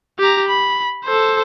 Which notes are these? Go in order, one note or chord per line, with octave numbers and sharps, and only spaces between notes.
G4 A#5
B5
A4 C5